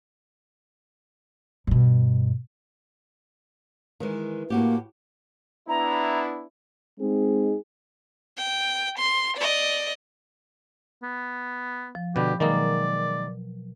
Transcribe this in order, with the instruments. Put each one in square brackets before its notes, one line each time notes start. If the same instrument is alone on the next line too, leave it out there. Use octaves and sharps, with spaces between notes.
[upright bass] G2 B2
[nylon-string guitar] D#3 E3 G#3
[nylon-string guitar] A2 F#4 G4 [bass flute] A#3
[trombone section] B3 D4 E4 [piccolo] A#5
[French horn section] G#3 C4 D#4 G#4
[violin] G5
C6
D5 D#5
[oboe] B3
[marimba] F3
[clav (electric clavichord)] B2 D3 [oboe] G4 [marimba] B5
[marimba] B2 F#3 A#4 [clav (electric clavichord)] D#3 G#3 A#3 [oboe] D5